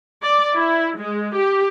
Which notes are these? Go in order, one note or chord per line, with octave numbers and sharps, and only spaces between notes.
D5
E4
G#3
G4